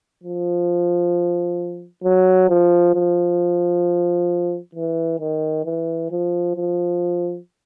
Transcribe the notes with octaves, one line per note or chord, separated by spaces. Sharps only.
F3
F#3
F3
F3
E3
D#3
E3
F3
F3